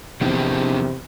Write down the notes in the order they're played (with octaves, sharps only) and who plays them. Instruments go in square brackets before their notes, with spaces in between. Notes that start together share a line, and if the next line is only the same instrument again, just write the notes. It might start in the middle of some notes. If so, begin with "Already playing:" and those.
[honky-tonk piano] F1 E2 D#3 [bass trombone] C3 [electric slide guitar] F3 D4 G#4